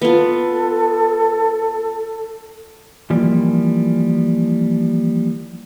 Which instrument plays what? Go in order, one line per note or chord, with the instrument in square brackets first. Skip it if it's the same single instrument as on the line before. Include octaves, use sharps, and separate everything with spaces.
[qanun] B3 F4 [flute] A4
[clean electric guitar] E3 F3 G3 A#3